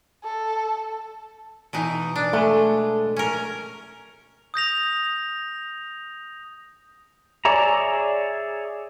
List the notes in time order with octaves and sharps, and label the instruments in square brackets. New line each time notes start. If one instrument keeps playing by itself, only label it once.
[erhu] A4
[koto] B2 E3 D#4
D4
[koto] G#3 [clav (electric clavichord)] A3
[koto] C#4 A#4
[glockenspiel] D#6 G6 A#6 F7
[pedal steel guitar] G#4 C#5 D5 E5 A#5